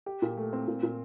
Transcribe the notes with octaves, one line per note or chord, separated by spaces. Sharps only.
G4
A#2
A3
C4
A#2
A#2